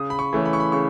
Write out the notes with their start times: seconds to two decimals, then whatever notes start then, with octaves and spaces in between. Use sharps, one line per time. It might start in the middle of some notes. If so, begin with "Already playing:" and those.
Already playing: C#3 D#6
0.10 B5
0.19 C#6
0.33 E3 A3 C#4
0.45 B5
0.53 C#6
0.60 B5
0.72 C#3 C#6